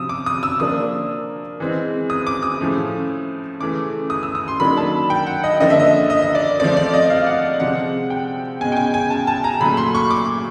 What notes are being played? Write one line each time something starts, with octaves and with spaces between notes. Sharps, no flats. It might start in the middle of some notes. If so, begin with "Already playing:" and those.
Already playing: C3 F3 D#6 E6
D6
D#6
E6
F3 A#3 D4 D#6
E3 G#3 C4
D#6
D6
D#6
A2 F3 A3 C#4
C#3 E3 A3 C#4 D6
D#6
E6
D#6
C6
D#3 F#3 A#3 D4 B5
A5
G5
F#5
D#5
D3 F3 A#3 D4 D#5
E5
D#5
D#5
D#5
D5
F3 A3 C4 D5
D5
D#5
F5
F#5
C3 F3 G#3 C4 F#5
G5
B2 G#3 C#4 G#5
G5
G#5
G#5
A5
A5
A#5
A#2 F#3 A3 B5
C6
C#6
D6